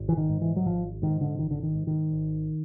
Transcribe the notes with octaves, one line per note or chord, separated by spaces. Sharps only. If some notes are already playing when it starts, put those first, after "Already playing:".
Already playing: G#1
E3
D#3
G#2
E3
F#3
G#1 F3
G#2 D#3
D3
G#1 D#3
D3
D#3
G#2
D#3
G#1